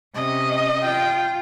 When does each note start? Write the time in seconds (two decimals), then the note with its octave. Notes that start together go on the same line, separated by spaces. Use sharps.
0.15 C3 C#4 D#5
0.83 F4 G5